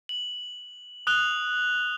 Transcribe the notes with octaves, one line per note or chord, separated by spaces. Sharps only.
F#7
D#6 F#6 F7 G7